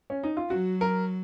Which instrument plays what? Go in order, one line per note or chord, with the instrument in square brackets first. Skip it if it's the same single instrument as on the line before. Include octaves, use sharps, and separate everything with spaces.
[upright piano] C#4
D#4
F4
[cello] F#3 [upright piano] F#4
[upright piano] A#4